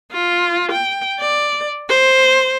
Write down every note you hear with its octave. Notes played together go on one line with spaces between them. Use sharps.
F4
G5
D5
C5